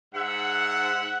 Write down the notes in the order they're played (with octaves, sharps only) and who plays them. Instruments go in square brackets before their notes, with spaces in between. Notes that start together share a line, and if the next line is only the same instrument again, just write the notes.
[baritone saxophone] G#2 [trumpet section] E5 F#5